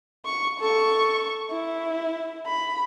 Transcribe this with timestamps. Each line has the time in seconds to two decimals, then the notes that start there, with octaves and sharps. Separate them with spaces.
0.25 C#6
0.59 A4 C#6
1.51 E4
2.46 B5